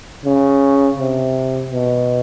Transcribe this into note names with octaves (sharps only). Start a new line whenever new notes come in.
C#3
C3
B2